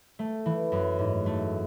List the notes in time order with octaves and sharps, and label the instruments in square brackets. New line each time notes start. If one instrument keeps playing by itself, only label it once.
[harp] A3
E3
F#2
G#2
A3